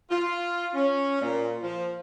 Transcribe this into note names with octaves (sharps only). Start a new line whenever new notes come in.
F4
C#4
A#2
F3